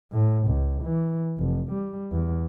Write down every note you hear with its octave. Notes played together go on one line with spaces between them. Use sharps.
A2
C#2
E3
F1
G3
E2